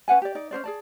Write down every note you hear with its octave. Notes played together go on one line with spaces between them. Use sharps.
C#4 B4 F#5 G#5
G4 D5
D#4 D5
C#4 D#4 C5 D5
G#4 D5 A5